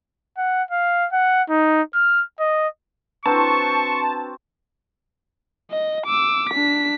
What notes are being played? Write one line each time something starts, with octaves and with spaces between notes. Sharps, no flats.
F#5
F5
F#5
D#4
F6
D#5
C4 D4 F#4 B4 A5 A#5 C#6
D#5
D6 E6
D4 B6